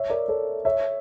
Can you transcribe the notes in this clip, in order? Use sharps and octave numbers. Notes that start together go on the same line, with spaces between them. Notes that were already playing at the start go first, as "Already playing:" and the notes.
Already playing: C#5 E5
A#4 D5
A4 C#5
C#5 E5